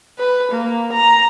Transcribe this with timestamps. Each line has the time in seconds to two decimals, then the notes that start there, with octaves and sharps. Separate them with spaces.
0.18 B4
0.51 A#3
0.93 A#5